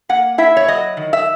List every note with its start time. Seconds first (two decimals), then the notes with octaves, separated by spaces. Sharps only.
0.09 A#3 F#5
0.38 E4 E5
0.57 C#5
0.68 F#3 D#5
0.97 D#3
1.13 E5